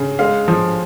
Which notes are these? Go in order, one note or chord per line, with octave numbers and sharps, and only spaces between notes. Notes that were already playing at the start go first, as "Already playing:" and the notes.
Already playing: C#3
G#3 F5
F3